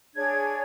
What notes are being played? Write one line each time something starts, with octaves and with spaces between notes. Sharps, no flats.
D4 G#4 C#5 G#6